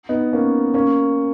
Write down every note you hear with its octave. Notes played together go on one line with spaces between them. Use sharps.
B3 D#4
A#3 C#4
A#3 C#4